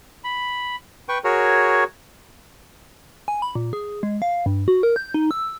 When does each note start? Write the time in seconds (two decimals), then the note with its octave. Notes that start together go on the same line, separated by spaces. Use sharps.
0.24 B5
1.09 B4 G5 C#6
1.24 F#4 G#4 A#4 C#5
3.28 G#5
3.42 B5
3.55 A#2
3.73 G#4
4.03 G#3
4.22 F5
4.46 G2
4.68 F#4
4.83 A#4
4.96 G6
5.14 D#4
5.31 E6